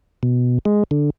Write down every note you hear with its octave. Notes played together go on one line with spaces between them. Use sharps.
B2
G#3
D3